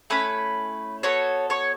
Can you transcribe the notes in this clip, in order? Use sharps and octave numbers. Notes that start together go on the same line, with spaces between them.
A3 C#4 E4 B4 B5
B3 F#4 A4 C#5 C#6
C#5 C#6